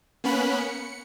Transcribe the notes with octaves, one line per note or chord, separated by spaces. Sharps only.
A#3 B3 C#4 B5 F#6
C#7